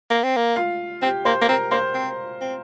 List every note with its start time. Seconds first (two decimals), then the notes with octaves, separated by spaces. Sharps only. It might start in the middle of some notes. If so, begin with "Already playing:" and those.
0.10 A#3
0.23 C4
0.36 A#3
0.56 F4 F5
1.02 C4 G4 G5
1.25 A#3 C5 C6
1.42 A#3
1.48 C4 A#4 A#5
1.71 A#3 C5 C6
1.94 C4
2.41 C4